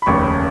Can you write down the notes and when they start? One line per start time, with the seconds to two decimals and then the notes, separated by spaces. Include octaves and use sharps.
0.02 B5
0.06 F1 D#2 C#3 C#6